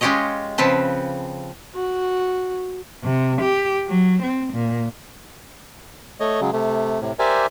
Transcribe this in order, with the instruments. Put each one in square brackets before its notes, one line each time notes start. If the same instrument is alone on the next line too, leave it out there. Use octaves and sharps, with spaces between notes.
[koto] G#3 C#4 F4 G4 C#5 D#5
C#3 F3 C4 B4 A5
[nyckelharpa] F#4
[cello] C3
G4
F#3
C4
A#2
[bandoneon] A3 C#5 D#5
C#3 F#3 G#3
C3 A3
A2 C3
G4 A#4 C5 D5 E5 G#5